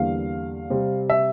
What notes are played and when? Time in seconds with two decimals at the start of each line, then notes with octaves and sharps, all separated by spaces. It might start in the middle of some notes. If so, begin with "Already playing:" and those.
Already playing: E2 D3 G3 A#3 F5
0.70 C3 G3 C4
1.10 E5